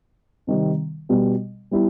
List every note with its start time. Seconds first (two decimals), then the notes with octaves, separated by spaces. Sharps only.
0.47 C3 D#3 G3 C4
1.09 B2 G3 B3
1.71 G3 B3 E4 G4